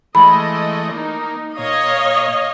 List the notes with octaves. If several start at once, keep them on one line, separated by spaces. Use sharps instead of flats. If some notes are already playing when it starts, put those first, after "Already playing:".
E3 G#3 A3 D#5 B5
A#3 D#4
A#2 C#5 D#5 F5